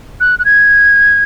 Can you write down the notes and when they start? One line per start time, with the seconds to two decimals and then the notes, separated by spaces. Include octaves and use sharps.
0.20 F#6
0.39 F#6
0.45 G#6